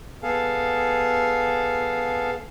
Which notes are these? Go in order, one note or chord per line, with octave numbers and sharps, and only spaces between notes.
B3 G#4 A4 F5